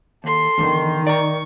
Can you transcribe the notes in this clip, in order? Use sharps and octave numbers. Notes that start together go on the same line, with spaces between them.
D#2 A4 C6
E2 D3 D#3
D5 A#5 C#6